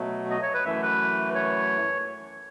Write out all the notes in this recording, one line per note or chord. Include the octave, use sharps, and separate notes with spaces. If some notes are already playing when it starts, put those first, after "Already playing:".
Already playing: B2 F#3 A3
D#5
C#5
B4
F#2 E3 A3 E5
B4
C#5